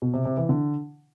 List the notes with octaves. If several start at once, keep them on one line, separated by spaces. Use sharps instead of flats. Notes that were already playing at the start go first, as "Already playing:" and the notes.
B2
C3
C3
E3
D3